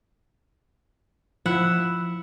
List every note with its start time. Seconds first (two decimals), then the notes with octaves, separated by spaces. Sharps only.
1.46 F3 E4 E5 F#5 E6